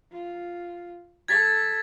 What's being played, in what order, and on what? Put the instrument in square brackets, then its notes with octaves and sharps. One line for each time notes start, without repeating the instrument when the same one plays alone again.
[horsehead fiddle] F4
[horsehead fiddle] A4 [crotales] G#6 A6 B6